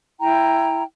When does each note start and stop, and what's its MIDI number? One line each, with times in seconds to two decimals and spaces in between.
0.21 0.83 64
0.21 0.83 79
0.21 0.83 82